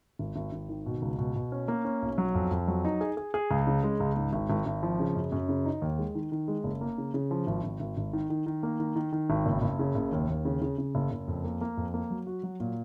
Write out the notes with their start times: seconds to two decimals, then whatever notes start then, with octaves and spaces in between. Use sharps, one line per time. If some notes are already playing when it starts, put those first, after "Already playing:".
0.19 G#1
0.36 G#1
0.52 G#1
0.69 D#3
0.86 B2
1.02 C#2
1.19 B2
1.35 B2
1.52 C#4
1.68 A#3
1.85 C#4
2.02 B1
2.18 F#3
2.35 F2
2.51 F2
2.68 F#3
2.85 D#4
3.01 G#4
3.17 G#4
3.34 G#4
3.51 C#2
3.67 C#3
3.83 G#3
4.00 C#2
4.17 G#2
4.33 G#1
4.50 G#1
4.66 G#1
4.83 F3
5.00 C#3
5.15 F#2
5.32 F#2
5.49 C#3
5.66 D#4
5.82 D#2
5.98 G#3
6.15 D#3
6.32 D#3
6.48 G#3
6.64 F#1
6.81 A#3
6.98 C#3
7.14 C#3
7.31 F3
7.47 G#1
7.64 G#1
7.80 G#1
7.97 G#1
8.13 D#3
8.30 D#3
8.46 D#3
8.63 A#3
8.80 D#3
8.96 D#3
9.13 D#3
9.30 G#1
9.46 F#1
9.62 F#1
9.79 C#3
9.95 F#1
10.12 D#2
10.29 D#2
10.45 C#3
10.62 C#3
10.78 C#3
10.95 F#1
11.11 F#1
11.28 F2
11.44 A#3
11.61 A#3
11.77 F2
11.94 A#3
12.10 F#3
12.27 F#4
12.43 F#3
12.60 A#2